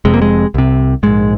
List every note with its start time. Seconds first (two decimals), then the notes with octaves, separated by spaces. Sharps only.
0.05 F1 F2 C3 G#3
0.14 A#3
0.22 G#3
0.54 C2 C3
1.03 A#1 G#2 G#3